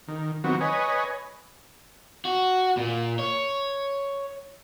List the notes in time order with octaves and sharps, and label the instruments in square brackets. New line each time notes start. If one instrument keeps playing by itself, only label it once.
[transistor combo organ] D#3
D#3 F#3 B3 C4 F#4
B4 C#5 D#5 G#5
[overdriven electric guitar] F#4
A#2
C#5